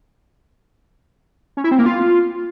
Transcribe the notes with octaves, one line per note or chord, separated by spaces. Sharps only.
C#4
E4
C4
A#3
F4